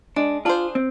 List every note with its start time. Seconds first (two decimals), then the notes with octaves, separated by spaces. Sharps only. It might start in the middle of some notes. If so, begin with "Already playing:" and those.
0.16 G#3 D4
0.45 D4 F4 G#4 C5
0.75 C4